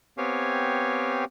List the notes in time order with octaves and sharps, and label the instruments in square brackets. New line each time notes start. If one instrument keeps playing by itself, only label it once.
[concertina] B3 C4 G4 C#5 F5 G#5